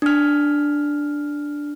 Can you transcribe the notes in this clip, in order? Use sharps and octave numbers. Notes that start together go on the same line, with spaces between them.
D4 F6